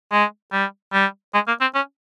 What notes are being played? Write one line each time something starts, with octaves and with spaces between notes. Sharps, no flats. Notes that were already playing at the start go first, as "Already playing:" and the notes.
G#3
G3
G3
G#3
A#3
C4
C#4